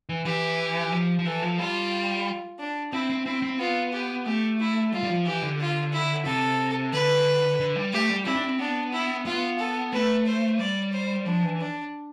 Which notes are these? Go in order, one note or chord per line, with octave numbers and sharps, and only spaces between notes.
E3
E3 G4
F3
F3
E3 A4
F3
G3 F4
D4
C4 E4
C4
C4 E4
C4
B3 F4
G4
A3 G4
E4
G3 F4
G3
F3
E3 G4
D3
F4
E4
C3 A4
D3 B4
D3
G3
A3 G4
G3
C4 E4
D4
C4
B3 D4
E4
B3 F4
A4
A3 B4
C5
G3 D5
C5
F3 D4
E3
D4